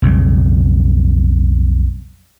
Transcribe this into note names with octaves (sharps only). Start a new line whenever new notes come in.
B1 F2 C#3 G3